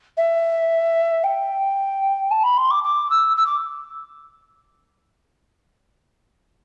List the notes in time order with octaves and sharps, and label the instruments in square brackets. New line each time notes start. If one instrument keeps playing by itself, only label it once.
[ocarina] E5
G5
A5
B5
C6
D6
D6
E6
E6
D6